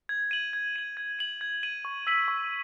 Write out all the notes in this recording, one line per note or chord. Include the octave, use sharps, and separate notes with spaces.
G#6
D#7 F#7
G#6
D#7 F#7
G#6
D#7 F#7
G#6
D#7 F#7
C#6
E6 B6 D#7 F#7
C#6